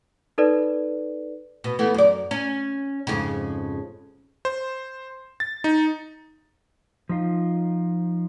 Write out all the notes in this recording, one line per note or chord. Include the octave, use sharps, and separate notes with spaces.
D#4 A4 B4 D5
B2
E3 A3 B3
F#2 D5
C#4
F2 G#2 C#3
C5
A6
D#4
F3 D#4 F4